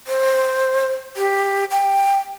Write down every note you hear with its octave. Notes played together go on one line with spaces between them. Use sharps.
C5
G4
G5